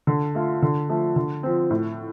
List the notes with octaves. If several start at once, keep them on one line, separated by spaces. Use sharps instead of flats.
D3
A3 F4
D3
F3 A3
D3
F3 C4
A2